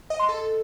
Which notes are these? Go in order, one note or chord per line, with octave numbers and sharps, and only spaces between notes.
D#5
C6
A4